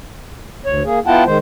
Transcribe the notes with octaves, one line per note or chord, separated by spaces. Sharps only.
D2 C#5
A#3 G#4
B3 E4 F4 F#5 G5 A5
D#3 G#3 C5